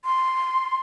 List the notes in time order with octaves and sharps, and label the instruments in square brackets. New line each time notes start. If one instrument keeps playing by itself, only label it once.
[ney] C6